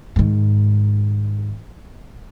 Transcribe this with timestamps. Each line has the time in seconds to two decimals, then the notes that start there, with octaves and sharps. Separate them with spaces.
0.16 G#2 D#3